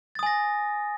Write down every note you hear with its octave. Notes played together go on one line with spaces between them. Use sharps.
G#5 D#6 A6 A#6